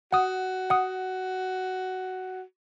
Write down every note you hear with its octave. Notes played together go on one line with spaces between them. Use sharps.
F#4 F#5 D#6
F#5 D#6